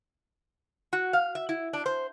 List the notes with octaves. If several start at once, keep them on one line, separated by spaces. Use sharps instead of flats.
F#4
F5
E5
E4
D4
C5